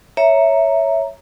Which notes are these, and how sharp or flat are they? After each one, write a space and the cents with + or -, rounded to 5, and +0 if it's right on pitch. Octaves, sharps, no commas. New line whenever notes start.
C#5 +0 E5 +0 A#5 +0